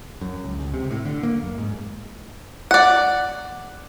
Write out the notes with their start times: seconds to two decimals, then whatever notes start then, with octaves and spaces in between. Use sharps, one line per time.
0.21 F#2
0.44 C#2
0.60 C#2
0.74 C3
0.91 A2
1.05 D3
1.23 A#3
1.43 F#2
1.58 G#2
2.71 D5 F#5